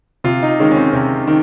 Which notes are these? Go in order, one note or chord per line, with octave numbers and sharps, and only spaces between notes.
C3 F4
D#4
D#3 G#3 C#4
C#4
C4
C3 C#4
D#3